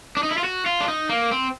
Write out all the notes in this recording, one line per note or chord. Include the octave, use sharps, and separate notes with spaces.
D4
D#4
E4
F4
F#4
F4
D4
D#4
A#3
C4